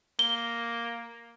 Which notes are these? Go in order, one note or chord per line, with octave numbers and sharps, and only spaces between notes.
A#3 G7